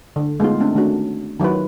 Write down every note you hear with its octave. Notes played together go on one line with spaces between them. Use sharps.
D3
G#3 A3 B3 D#4 F4
A3 C4 D4
D#3 A3 C#4 D4 F#4
D#3 F#3 E4 F4 B4